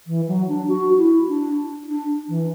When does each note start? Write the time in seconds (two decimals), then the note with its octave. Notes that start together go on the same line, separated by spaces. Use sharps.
0.07 E3
0.28 F#3
0.48 D4
0.68 F#4
0.98 E4
1.28 D4
1.89 D4
2.28 E3